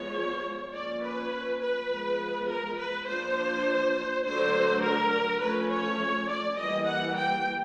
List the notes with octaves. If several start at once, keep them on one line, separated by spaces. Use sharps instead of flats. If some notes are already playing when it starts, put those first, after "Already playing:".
Already playing: F3 G#3 B3 C#5
F3 A#3 C#4 D5
B4
B4
F3 G#3 B3
A#4
B4
F3 A#3 D4 C5
D3 F#3 A3 D4 C5
A#4
F3 A3 C#4 B4
C#5
D5
E3 G3 A#3 D#5
F#5
G5